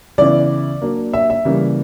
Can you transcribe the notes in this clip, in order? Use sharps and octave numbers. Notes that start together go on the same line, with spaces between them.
C#3 E3 B3 E4 D5
F#3 A#3 D4
E5
E5
C#3 E3 G3 A#3